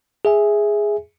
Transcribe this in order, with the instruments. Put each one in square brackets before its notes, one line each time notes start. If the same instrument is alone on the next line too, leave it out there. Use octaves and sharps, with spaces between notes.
[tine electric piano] G#4 E5 G#5